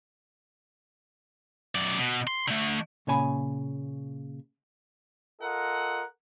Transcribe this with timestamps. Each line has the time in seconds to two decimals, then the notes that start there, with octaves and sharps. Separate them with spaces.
1.75 F#2 D5
1.98 B2
2.27 C6
2.48 D3 A3
3.07 A#2 C#3 C#5 G#5 B5
5.41 F4 A4 A#4 D#5 F#5